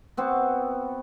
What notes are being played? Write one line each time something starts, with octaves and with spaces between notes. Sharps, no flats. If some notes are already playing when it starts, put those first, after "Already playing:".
B3 C4 F#4